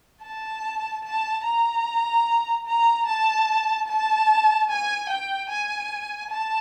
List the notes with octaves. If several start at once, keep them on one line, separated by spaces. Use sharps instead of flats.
A5
A5
A#5
A#5
A5
A5
G#5
G5
G#5
A5